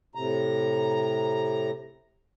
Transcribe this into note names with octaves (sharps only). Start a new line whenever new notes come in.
A2 C3 A#5